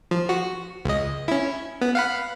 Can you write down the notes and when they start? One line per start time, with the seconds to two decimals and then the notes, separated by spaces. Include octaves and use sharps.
0.11 F3
0.29 F#4
0.85 C#2 D#5
1.28 C#4 E4
1.81 B3
1.95 F5 F#5 B5